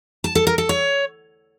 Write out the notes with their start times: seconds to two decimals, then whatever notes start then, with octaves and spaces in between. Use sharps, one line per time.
0.24 A5
0.35 A4
0.47 A#4
0.58 A4
0.69 C#5